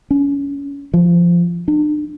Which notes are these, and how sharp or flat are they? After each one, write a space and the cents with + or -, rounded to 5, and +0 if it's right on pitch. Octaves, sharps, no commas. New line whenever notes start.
C#4 +25
F3 -15
D4 +40